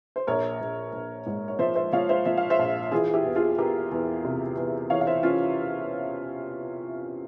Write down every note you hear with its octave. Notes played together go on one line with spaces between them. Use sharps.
C5
A#1 A#4 C#5
A#1
A#1
G#2
C#5
F3 C5 E5
C5 E5
F3 C#5 F5
C5 E5
F3 E5
F5
C5 E5
A#1
E3 F4 G#4
E4 G4
E2
F4 G#4
E2 G4 A#4
E2
C3
E2
E3 C#5 F5
F5
C5 E5
C#4 F4